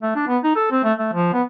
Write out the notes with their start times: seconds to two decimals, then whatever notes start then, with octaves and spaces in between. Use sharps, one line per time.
0.02 A3
0.16 D4
0.28 B3
0.44 D#4
0.56 A4
0.71 C4
0.84 A3
0.99 A3
1.13 F3
1.33 B3